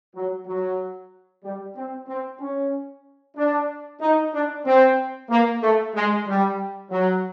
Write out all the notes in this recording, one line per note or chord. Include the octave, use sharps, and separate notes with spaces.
F#3
F#3
G3
C4
C4
C#4
D4
D#4
D4
C4
A#3
A3
G#3
G3
F#3